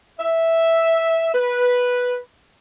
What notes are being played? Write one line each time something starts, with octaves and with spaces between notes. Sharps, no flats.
E5
B4